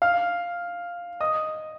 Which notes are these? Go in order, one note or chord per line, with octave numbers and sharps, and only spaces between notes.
F5 F6
D#5 D#6